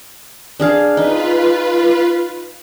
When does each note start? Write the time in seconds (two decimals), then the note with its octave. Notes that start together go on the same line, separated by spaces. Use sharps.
0.60 D4 G#4 F5
0.97 D#4 F4 B4